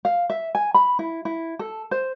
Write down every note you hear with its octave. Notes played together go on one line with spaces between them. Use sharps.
F5
E5
G#5
B5
E4
E4
A4
C5